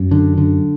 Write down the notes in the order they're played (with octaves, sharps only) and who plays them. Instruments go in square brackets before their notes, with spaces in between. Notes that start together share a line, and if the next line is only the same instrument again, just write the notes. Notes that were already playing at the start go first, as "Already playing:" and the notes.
Already playing: [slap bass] F#2
[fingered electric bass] D3
D3